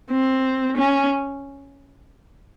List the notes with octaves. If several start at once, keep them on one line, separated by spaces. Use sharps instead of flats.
C4
C#4